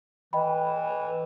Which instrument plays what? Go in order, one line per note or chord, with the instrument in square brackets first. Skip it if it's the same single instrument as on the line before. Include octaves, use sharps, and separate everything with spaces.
[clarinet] E3 [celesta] D#5 G5 B5